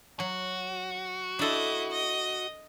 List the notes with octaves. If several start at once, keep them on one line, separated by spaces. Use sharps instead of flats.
F#3 F#4
D4 E4 A4 D#5
D#5